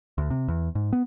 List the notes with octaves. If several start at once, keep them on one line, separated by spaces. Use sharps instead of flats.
D2
C3
E2
G#2
B3